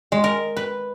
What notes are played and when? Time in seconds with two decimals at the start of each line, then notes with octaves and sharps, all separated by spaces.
0.12 G#3
0.24 A#4
0.56 B4